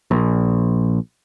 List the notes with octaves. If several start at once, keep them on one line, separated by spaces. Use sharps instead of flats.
A#1